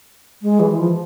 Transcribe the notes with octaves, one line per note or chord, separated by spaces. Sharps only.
G#3
E3
F3